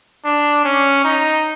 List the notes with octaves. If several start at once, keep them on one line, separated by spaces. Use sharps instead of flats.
D4
C#4
D#4